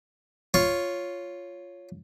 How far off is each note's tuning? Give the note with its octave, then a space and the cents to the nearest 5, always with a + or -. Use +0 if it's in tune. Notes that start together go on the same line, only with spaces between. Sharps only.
F4 +0 C#5 +0